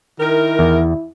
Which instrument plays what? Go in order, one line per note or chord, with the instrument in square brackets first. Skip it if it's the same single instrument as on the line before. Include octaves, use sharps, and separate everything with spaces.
[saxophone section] D#3 A#4 [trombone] E4
[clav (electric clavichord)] E2